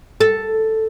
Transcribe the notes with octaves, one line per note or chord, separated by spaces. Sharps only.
A4